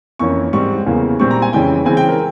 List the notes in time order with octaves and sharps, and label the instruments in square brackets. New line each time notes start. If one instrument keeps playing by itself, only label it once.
[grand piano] F2 E3 A#3 C#4 C#6
G#2 G3 C4 C#6
E2 C#3 E3 A#3
A#2 G3 C4 C#6
A#5
G#5
F2 C#3 E3 G3 C#4 G5
C#3 E3 G#3 C4 G#5
G5
A#4